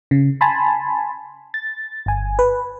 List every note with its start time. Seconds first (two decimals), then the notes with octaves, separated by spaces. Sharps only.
0.11 C#3
0.41 G#5 A5 B5 C6
1.54 A6
2.06 G1 G#5
2.39 B4